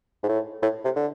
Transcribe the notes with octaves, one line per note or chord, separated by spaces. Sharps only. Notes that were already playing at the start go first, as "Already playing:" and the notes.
G#2
A2
A2
C3
D3